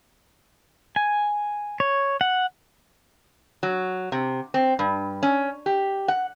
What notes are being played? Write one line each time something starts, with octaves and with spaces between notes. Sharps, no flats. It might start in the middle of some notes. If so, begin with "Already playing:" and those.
G#5
C#5
F#5
F#3
C3
C4
G2
C#4
G4
F#5